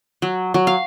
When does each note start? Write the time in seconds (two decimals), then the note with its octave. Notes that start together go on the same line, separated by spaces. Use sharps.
0.22 F#3
0.54 F#3
0.67 F5